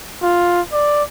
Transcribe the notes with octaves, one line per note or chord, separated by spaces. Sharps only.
F4
D5